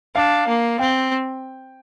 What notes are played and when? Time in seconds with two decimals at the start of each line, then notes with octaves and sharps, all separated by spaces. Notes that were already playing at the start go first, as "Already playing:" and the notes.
0.15 D4 F5
0.48 A#3
0.79 C4 G5